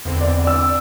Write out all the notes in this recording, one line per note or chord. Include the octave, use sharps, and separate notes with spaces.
E2 D3 C4
D5
D5 E6